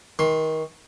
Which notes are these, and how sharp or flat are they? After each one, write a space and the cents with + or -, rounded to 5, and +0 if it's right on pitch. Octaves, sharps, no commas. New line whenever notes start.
D#3 +25 C6 +20